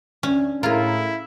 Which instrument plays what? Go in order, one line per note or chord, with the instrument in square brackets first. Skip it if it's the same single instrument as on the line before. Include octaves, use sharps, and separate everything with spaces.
[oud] D2 [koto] C#4
[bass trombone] A2 [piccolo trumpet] E4 [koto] F4 [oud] G#4 A#4